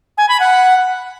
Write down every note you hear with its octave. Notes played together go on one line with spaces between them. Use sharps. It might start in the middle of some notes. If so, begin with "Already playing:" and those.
G#5
B5
F#5